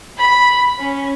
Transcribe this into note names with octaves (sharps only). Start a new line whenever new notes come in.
B5
C#4